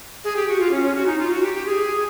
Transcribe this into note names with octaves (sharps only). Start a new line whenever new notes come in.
G#4
G4
F#4
F4
C#4
C#4
F#4
D#4
F4
F#4
G4
G4
G#4